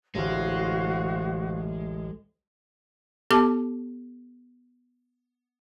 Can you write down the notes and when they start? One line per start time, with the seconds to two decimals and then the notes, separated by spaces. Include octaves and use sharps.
0.15 A1 D2 A2 G#3 F#4 C5 F5
3.30 B3 G4 A4 A5 D6